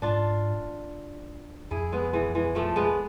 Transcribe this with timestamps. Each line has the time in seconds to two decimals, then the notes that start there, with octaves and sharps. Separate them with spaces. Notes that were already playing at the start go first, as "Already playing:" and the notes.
0.02 G#2 D4 F4
1.71 F2 E4 G#4
1.92 G#3 B3
2.13 E3 G#3
2.35 E3 G#3
2.55 F3 A3
2.76 G#3 B3